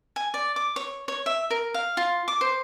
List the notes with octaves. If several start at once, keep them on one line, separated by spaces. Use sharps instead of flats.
G#5
D5
D6
C#5
C#5
E5
A#4
F5
F4
D6
C5